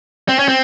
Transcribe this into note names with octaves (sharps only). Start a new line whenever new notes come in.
C4
C#4
C4